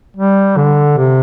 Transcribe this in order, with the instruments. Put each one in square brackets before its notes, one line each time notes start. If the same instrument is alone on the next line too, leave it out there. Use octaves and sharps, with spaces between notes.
[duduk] G3
D3
C3